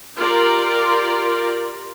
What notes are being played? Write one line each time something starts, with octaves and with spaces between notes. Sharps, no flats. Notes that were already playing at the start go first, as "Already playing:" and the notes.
F4 G4 A#4 D5